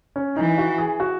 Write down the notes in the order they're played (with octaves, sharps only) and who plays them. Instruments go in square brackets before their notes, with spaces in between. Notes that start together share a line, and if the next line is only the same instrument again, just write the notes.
[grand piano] C#4
[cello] E3 [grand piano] D#4
[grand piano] F#4
G#4
F#4